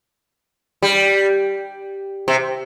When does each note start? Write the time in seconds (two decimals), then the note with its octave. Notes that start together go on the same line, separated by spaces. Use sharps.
0.82 G3
2.28 C3